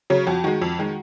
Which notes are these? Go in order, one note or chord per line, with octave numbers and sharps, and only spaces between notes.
C#3 F#3
F2 F#4
D#3 G#3 F#4
F2
D#3 G#3